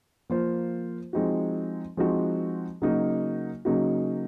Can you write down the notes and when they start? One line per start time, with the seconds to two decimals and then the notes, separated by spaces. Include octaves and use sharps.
0.30 F3 A#3 F4 C5
1.13 F3 G#3 C4 D#4 F#4
1.97 F3 G#3 C4 D#4 F#4
2.82 C#3 F#3 A#3 D#4 F#4
3.65 C#3 F#3 A#3 D#4 F#4